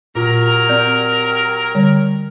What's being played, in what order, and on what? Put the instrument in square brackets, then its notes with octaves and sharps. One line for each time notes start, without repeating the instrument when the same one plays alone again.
[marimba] A#2 F4 [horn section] F#3 G4 A#4
[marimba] C4 D5 G6
D3 G3 C#5